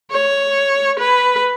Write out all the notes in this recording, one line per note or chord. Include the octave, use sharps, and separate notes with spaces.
C#5
B4